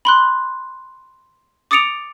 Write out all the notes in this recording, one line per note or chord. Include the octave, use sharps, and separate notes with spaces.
B5 C6 F#6
D6 D#6 A6 C#7 D7 F7